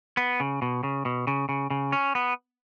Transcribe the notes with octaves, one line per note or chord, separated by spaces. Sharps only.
B3
C#3
B2
C#3
B2
C#3
C#3
C#3
C#4
B3